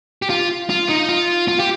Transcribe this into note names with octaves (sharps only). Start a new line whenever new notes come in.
G4
F4
F4
D#4
F4
F4
G4